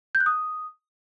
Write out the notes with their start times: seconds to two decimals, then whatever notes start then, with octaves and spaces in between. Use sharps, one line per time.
0.15 G6
0.20 F#6
0.26 D#6